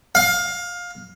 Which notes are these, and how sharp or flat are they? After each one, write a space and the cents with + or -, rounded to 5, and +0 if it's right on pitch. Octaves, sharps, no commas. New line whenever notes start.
F5 +20